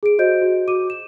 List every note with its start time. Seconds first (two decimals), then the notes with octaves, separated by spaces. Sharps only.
0.03 G#4 D7
0.19 F#4 C5 D#5 G6 D7
0.42 F#4
0.68 F#4 D6 D#7
0.90 E7